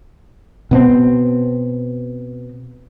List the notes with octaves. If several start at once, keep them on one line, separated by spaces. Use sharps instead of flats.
B2 B3 C4